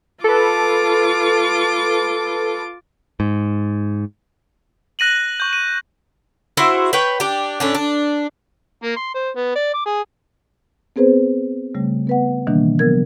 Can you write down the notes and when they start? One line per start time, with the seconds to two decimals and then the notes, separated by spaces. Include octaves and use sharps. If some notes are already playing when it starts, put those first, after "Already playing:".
0.24 F4 A4 B4 D6
3.20 G#2
4.99 F#6 A#6 D#7 F#7
5.40 C#6 G6
5.53 D#7
6.57 E4 F#4 G#4 C5
6.93 B4 C#5 G5
7.20 D4 G4
7.60 A2 C#4 D4
7.75 D4
8.84 A#3
8.96 C6
9.15 C5
9.36 B3
9.56 D5
9.74 D6
9.86 G#4
10.96 B3 C4 G#4 B4 C5
11.75 C#3 G3 A3
12.07 B3 B4 F#5
12.47 B2 D#3 E3 G3 A#3 D4
12.79 C#3 F#3 B3 A#4 G#6